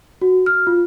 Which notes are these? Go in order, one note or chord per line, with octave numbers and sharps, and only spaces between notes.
F#4
F6
F4